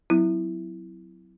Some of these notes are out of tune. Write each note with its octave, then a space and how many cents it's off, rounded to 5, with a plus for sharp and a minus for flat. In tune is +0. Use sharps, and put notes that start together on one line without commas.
F#3 +0 C4 -35 E4 +0